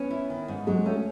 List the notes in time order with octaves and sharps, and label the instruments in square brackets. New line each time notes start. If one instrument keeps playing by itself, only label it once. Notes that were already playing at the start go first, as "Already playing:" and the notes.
Already playing: [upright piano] B3 [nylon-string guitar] C#4
[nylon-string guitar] E4
D#3
G#2
[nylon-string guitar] F#3 [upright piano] G#3
[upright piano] A3 [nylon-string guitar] C#4